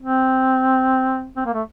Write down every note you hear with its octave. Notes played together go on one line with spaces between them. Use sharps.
C4
C4
A#3
A3